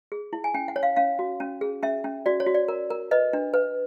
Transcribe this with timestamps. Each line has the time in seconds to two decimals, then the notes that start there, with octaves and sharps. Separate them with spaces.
0.12 G#4
0.33 E4
0.44 G#5
0.54 C#4 G5
0.68 F#5
0.76 C#5
0.83 F5
0.96 C#4 F5
1.19 F#4
1.40 C#4
1.61 G#4
1.83 C#4 E5
2.04 C#4
2.26 F#4 D5
2.40 C#5
2.46 F#4
2.55 D5
2.68 A#4
2.90 A#4
3.11 B4 D#5
3.33 D4
3.54 B4